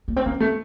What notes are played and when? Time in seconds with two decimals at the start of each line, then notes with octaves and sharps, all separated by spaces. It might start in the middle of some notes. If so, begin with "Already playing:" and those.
0.08 A#3
0.16 C4
0.26 A#3 C#4
0.40 A3